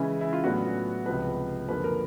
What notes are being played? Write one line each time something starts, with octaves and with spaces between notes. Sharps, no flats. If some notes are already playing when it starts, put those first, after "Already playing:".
Already playing: C#3 E3 G#3 C#4 E4
E4
F4
A2 F#3 B3 D4 F#4
C#2 C3 F3 B4
F#2 D3 F3 A#3 C#4 B4
A#4